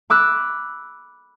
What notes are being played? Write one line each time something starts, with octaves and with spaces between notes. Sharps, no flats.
B5 D6 E6 F#6